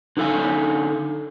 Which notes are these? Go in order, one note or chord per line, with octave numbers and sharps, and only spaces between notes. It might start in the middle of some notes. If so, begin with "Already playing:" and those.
D3 D#4 A4 F5 G#5